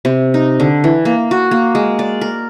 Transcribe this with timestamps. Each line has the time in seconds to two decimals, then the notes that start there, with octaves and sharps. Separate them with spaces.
0.05 C3
0.34 D#4
0.60 D3
0.84 E3
1.05 A#3
1.31 F#4
1.51 A#3
1.75 G#3
1.99 D5
2.21 A#4